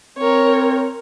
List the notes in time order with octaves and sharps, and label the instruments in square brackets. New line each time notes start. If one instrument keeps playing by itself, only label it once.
[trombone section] C4 [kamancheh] A#4 C#5